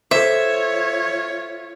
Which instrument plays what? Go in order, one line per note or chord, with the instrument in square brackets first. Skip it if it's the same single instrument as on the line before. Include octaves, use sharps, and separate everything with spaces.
[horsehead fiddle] F4 C#5 [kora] A4 C5 [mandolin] E5